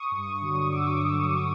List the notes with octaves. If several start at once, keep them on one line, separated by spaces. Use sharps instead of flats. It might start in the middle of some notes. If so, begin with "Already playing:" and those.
Already playing: C#6 D#6
G2
D3 F#3
G2 D6 E6